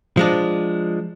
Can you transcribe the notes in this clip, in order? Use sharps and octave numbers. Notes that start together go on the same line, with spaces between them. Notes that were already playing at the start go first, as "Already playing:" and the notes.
F3 G#3 D4